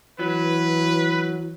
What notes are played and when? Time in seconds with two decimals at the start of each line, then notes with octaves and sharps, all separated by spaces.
0.19 E3 F#3 B4